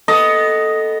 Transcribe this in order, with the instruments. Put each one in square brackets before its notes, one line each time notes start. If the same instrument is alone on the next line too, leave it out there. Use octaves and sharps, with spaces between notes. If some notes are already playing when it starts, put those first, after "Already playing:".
[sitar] B3 A4 [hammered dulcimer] D#5